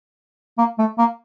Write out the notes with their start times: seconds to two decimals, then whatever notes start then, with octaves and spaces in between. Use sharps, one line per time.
0.58 A#3
0.79 A3
0.98 A#3